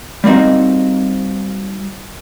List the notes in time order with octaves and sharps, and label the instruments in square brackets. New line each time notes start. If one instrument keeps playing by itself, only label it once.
[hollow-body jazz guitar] G3 A#3 C4 D#4 F#4